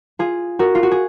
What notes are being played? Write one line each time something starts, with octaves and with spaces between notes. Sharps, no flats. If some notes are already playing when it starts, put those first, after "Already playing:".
F4 G#4
F#4 A#4
F4
F#4
G#4